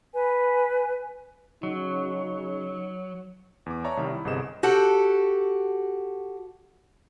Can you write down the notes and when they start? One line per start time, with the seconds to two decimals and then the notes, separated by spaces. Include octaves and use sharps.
0.13 B4 G#5
1.63 C#3 F#3 D#4
3.66 E2 D6
3.84 C#5 D5 E5 A5 A#5 C#6
3.97 C2 D#3 G3
4.11 E4
4.25 G1 C2 C3 G#4 D#5 E7
4.63 F#4 G4 A4 F#5